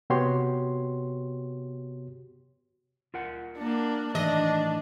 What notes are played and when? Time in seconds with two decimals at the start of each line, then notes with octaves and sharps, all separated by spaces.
0.10 C3 B3 F#4 G4 C#5 C6
3.14 F4 A#4 F#5
3.57 A#3 D4
4.15 A2 D#3 E3 D4 D#5